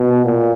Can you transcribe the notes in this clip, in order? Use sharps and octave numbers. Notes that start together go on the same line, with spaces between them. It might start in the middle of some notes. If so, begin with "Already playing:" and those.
Already playing: B2
A#2